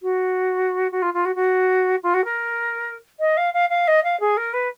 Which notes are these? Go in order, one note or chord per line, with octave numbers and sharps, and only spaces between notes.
F#4
F#4
F4
F4
F#4
F#4
F4
F#4
A#4
D#5
F5
F5
F5
D#5
F5
G#4
A#4
B4